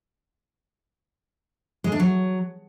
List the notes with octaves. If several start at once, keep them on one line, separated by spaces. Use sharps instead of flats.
G#3
D4
F#3